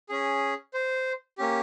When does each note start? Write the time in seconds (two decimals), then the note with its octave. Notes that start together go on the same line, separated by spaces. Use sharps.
0.09 C#4 G#4
0.74 C5
1.38 A#3 C#4 G4